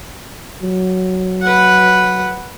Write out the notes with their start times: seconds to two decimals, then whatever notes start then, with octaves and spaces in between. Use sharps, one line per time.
0.62 F#3
1.42 B4 F#5